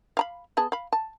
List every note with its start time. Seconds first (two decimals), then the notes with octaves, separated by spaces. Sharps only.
0.17 F5 A#5 B5
0.57 B3 G#4 A5
0.72 F5 B5
0.92 A5